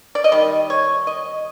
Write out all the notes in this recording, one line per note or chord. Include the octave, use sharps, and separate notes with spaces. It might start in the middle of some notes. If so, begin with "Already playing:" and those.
D5
D#5
D#3 G3
C#5
D#5